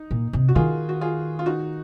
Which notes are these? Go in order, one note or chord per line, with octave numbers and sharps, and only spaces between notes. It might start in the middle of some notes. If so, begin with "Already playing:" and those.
Already playing: D#4
A#2
C3
F#4
D#3 F4 G#4
F#4
F4 G#4
F4
D#4 F#4